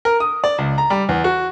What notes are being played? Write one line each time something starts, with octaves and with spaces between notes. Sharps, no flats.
A#4
D#6
D5
C#2
A#5
G3
E2
F#4